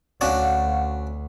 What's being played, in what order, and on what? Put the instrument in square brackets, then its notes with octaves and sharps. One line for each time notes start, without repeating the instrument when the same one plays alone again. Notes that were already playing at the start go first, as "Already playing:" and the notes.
[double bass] D2 [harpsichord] C#4 D4 F#4 [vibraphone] F5 F#5